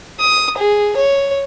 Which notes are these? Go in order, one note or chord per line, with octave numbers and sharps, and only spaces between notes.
D#6
G#4
C#5